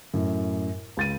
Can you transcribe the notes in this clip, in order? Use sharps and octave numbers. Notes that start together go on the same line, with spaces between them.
F#2 A2
C#2 A6 D#7